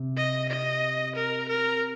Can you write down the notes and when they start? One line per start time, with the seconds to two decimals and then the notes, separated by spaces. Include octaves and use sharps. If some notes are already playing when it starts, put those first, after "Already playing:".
Already playing: C3
0.17 D#5
0.49 D#5
1.16 A#4
1.49 A#4